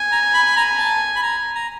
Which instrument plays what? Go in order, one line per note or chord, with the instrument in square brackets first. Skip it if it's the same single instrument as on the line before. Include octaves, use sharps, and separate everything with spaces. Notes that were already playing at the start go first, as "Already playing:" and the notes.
Already playing: [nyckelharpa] G#5
[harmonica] A#5
B5
B5
A#5
A5
B5
A#5
A#5